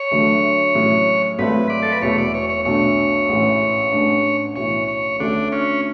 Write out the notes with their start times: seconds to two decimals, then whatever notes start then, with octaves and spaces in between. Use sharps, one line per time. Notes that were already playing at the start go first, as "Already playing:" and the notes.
Already playing: C#5
0.11 D2 D3 F#3 A3
0.75 A2 F#3 C#4
1.38 G#1 G#2 F#3 A3 B4
1.70 D5
1.82 A4
1.92 B4
2.02 E1 E2 B2 A3 C#5
2.18 D5
2.34 C#5
2.50 C#5
2.65 B1 B2 A3 D4 C#5
3.29 A1 G#2 E3 A3 C#4
3.92 A1 A2 G#3 D4
4.56 B1 A2 E3 C#5
4.88 C#5
5.20 D2 D3 A3 C#4 D4
5.52 C#4